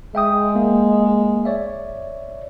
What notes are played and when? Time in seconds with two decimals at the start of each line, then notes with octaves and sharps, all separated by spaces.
0.15 G#3 E5 G5 D#6
0.56 A#3
1.45 C#5 D5 E5